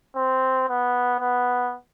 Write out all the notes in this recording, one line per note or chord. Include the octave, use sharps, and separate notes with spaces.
C4
B3
B3